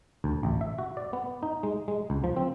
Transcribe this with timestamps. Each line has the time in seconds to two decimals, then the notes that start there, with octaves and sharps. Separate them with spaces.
0.24 D2
0.43 A1
0.61 E5
0.78 F#4
0.97 D5
1.13 B3
1.43 D#4
1.63 G#3
1.88 G#3
2.10 C#2
2.24 F3
2.37 C4